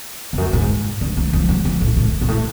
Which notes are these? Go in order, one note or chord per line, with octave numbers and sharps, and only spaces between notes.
F2
F#2
G#2
D3
F3
F3
F#3
F3
A2
A2
G#2
A2